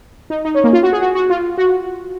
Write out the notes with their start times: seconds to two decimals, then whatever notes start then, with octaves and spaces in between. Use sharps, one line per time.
0.30 D#4
0.45 D#4
0.55 C#4
0.64 A#3
0.73 F4
0.83 F#4
0.92 G#4
1.01 F#4
1.15 F#4
1.30 F4
1.58 F#4